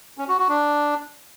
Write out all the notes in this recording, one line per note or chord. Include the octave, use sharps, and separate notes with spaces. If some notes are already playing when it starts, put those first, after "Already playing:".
C#4
F#4
F#4
D4